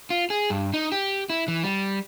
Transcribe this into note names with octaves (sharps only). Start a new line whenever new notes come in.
F4
G#4
G2
D#4
G4
E4
E3
G3